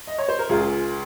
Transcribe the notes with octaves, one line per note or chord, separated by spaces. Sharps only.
D#5
C#5
C5
A#4
C#2 F4 G#4